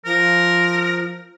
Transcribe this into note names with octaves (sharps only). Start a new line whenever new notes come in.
F3 A#4